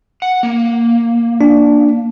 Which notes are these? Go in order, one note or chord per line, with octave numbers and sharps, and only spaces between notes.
F#5
A#3
D4